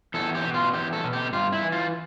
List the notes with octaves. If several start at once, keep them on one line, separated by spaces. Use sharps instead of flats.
E2 A4
G4
B2
F4
E2 G4
A4
B2
G4
G2 F4
E4
E3
F4